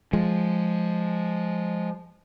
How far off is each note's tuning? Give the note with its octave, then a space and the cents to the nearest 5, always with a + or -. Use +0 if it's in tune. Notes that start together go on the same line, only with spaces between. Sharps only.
F3 +0 G#3 +0